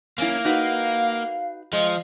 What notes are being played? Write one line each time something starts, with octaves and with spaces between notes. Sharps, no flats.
F#2 A#3 C#4 E4
D#4 F#4 B4 F5
F3 G#3 D#5